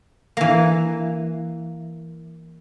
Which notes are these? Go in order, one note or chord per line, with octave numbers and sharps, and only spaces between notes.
E3 A#3